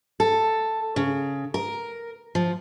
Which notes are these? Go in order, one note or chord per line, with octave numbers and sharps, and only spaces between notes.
A4
C#3
A#4
F3